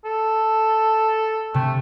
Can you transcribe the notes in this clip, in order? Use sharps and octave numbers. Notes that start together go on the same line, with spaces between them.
A4
C3 A3